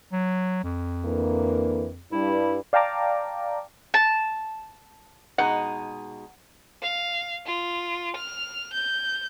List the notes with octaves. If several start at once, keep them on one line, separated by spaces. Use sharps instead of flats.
F#3
F2
D3 E3 A#3
G2 E4
D5 F5 G5 A5 A#5 D6
A5
B2 G#3 D#4 F#5
F5
F4
F6
G6